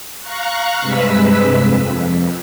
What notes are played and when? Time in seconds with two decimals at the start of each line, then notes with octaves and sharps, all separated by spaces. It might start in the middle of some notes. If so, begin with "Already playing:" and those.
0.20 F5 A#5 C#6 F#6
0.81 G2 C3 G#3 B4 E6 B6
1.54 F2